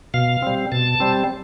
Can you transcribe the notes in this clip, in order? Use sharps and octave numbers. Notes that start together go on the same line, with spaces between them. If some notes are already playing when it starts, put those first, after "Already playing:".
B2 F5
G3 C4
B2 A5
G3 C4